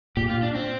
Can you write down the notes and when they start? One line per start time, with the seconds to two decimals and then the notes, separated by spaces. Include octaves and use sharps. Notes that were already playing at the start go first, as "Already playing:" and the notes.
0.17 A#2 G4
0.30 F4
0.42 D4
0.55 C4